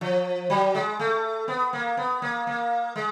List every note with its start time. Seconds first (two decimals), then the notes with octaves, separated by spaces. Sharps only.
0.01 F3
0.50 F#3
0.75 G#3
0.99 A3
1.48 B3
1.73 A#3
1.97 B3
2.22 A#3
2.47 A#3
2.96 G#3